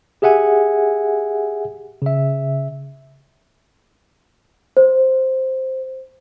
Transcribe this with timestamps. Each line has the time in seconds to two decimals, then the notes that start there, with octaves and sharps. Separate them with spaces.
0.22 G4 G#4 E5 F#5 G#5
2.02 C#3 E5
4.77 C5